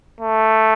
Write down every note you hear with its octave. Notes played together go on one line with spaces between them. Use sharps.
A3